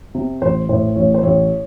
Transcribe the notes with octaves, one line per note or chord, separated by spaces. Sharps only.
C3
A1 C5
A2 C5
A1 C#5
C5
A1 C#5